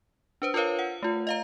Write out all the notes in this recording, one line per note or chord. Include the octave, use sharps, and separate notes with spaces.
D4 B4 C5
F4 A#4 B4 C#5 F5
F#5
A3 F4
D#5 F5 A#5